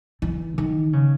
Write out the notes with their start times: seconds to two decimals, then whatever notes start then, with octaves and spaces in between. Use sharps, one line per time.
0.22 E3
0.58 D#3
0.93 C#3